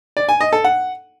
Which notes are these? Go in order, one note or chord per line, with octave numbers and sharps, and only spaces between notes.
D5
G#5
D#5
A4
F#5